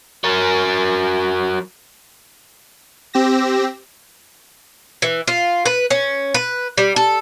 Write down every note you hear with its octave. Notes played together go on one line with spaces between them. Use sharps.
F#3 A#4
C4 G4 E6 A#6
E3
F4
B4
C#4
B4
G3
A4